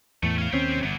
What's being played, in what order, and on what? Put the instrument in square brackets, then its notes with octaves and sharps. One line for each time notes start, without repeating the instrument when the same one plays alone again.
[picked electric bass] E2 A2 [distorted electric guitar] A3
[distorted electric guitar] C#4 F5
[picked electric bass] D#2 C4 C#4 [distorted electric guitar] G4 C5
[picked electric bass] G1 [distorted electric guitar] E3 B3